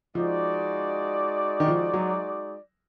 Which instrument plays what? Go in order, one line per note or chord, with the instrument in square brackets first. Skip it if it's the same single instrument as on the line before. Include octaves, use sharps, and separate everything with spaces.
[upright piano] F3 [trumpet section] G#3 D#4 F#4 D5
[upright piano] D#3
F3
F#3